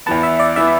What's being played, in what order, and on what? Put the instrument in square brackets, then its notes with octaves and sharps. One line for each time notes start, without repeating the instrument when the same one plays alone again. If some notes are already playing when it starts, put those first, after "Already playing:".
[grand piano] E2 E3 B3 [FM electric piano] A5
[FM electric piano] E5
D5
[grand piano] E3 B3 [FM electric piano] E5